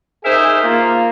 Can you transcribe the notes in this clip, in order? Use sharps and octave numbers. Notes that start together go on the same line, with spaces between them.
D#4 G#4 A#4 C5 E5 G#5
A#3 F4